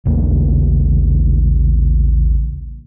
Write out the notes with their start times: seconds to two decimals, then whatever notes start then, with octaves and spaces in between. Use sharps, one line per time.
0.05 A1 D#2 C#3 A#3